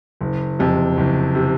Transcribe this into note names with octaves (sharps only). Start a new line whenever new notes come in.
F#1
F2 C3
F#1
C3